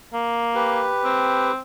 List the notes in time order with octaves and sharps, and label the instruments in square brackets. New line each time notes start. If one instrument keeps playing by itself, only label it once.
[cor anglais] A#3
[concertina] G4 B4
[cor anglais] C4